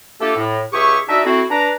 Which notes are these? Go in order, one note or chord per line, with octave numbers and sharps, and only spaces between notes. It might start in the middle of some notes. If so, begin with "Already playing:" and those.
A3 A#3 D4 F4 G4 A4
A2
C#2 G4 G#4 E5 C#6
D4 D#4 F#4 D#5 E5
A3 C4 E4 F#4
D4 B4 A#5